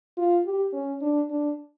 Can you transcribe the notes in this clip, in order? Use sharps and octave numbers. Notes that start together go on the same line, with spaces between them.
F4
G4
C#4
D4
D4